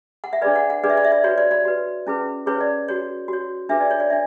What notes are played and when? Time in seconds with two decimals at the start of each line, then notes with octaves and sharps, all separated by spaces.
0.24 F#5
0.33 E5
0.41 D4 G#4 B4 D5
0.56 F#5
0.70 F#5
0.83 D4 G#4 B4 D5
0.90 E5
0.97 D5
1.05 E5
1.12 D5
1.24 F#4 B4 C#5
1.38 D5
1.51 D5
1.65 F#4 B4
2.07 C#4 E4 G#4 B4
2.46 C#4 E4 G#4 B4 C#5
2.61 D5
2.88 F#4 C#5
3.28 F#4 C#5
3.69 D4 G#4 B4 E5
3.80 D5
3.91 C#5
4.00 D5
4.10 D4 E5